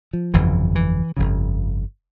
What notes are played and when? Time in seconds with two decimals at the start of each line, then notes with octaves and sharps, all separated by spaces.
0.13 F3
0.34 G1 F2 C#3 E3
0.75 E3
1.17 G1 F2 C#3